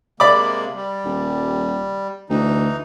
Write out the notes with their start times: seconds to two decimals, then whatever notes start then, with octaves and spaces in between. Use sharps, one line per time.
0.20 C3 G#3 A#3 D5 B5 D6
0.75 G3
1.04 D#1
2.30 D2 E3 D#4